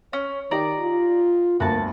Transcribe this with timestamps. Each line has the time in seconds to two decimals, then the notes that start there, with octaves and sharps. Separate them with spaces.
0.13 C#4 C#5
0.51 D#3 D#4 G4 D5 A#5
0.80 F4
1.60 G1 D2 A#3 F#4 A5